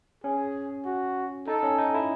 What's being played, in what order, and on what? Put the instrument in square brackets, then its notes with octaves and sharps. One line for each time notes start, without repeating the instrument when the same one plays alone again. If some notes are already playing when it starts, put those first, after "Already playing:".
[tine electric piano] C#4 [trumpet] G#4
[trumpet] F#4
[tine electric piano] D#4 [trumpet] A4
[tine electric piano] C#4
D#4
E4